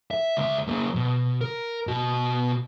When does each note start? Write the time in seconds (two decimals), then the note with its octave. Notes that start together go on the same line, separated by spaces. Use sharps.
0.11 E5
0.37 C#2 E5
0.68 F#3 A#3
0.95 B2
1.41 A#4
1.87 B2 F#4